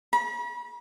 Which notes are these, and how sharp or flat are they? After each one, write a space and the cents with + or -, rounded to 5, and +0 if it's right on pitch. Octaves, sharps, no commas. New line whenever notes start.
B5 -40